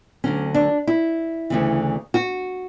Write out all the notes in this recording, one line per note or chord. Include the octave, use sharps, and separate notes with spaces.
D2 D3 F#3 C#4
D4
E4
D2 C#3 E3
F#4